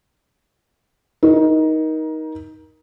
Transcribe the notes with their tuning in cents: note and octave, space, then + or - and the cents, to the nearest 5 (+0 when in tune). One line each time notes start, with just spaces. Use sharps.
D#4 +15 A#4 +25